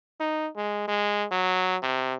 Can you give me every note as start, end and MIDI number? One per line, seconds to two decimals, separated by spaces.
0.20 0.48 63
0.56 0.87 56
0.88 1.25 56
1.32 1.77 54
1.82 2.15 48